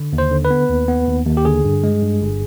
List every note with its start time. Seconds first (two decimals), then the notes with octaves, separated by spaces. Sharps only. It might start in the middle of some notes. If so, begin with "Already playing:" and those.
Already playing: D3
0.13 D#2
0.18 C5
0.31 D3
0.45 B4
0.51 B3
0.70 D#2
0.88 B3
1.08 D#2
1.26 D#2
1.37 G4
1.45 D3 G#4
1.65 G2
1.84 G#3
2.02 G2
2.22 G1